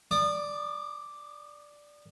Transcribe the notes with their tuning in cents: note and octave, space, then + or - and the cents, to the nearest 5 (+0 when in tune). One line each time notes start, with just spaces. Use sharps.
D5 +0 D#6 -35